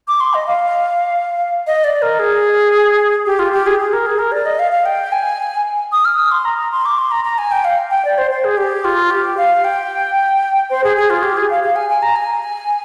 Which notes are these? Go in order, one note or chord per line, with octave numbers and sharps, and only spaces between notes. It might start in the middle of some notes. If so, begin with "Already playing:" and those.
D6
C6
D#5
F5
D#5
D5
A#4
G#4
G4
F4
G4
G#4
G#4
A#4
G#4
A#4
D5
D#5
F5
F5
G5
G#5
D#6
F6
D#6
C6
A#5
A#5
C6
D6
C6
A#5
A#5
G#5
G5
F5
G5
D5
C5
C5
G#4
G4
F4
G4
F5
G5
C5
G#4
G#4
F4
G4
G#4
F5
F5
G#5
G#5
A#5
G#5